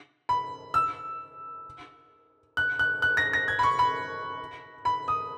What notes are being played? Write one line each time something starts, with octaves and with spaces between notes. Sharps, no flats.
B5
E6
F#6
F#6
F#6
A#6
A#6
G#6
B5
C#6
B5
B5
D#6